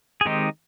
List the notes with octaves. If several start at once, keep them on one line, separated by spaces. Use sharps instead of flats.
G#4
D#3 G#3 C4 D#4 G4